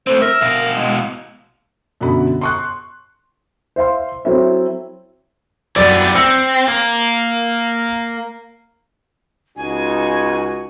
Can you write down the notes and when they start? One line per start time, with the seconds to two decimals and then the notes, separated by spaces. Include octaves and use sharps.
0.07 A3 C4 C5
0.22 A#4 E5
0.42 B2 F5
0.76 G#3
2.01 F#2 B2 D3 F#4 B5
2.41 C6 C#6 F#6
3.76 C5 E5 F5 C6
4.25 F#3 C4 E4 A4 C#5 E5
5.76 F#2 E3 G3 B3 D5
6.15 C4 E6 A#6 C#7
6.68 A#3
9.57 C#2 D#4 F#4 G#5